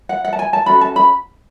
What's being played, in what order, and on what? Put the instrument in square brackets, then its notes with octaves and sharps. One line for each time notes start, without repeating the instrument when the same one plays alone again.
[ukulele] F#5
F#5
A5
G#5
A5
C#4 F#4 A4 B5
A5
B5